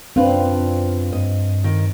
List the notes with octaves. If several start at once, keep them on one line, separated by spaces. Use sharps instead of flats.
F#2 C4 D4 F4 B4
G2 D#5
D#3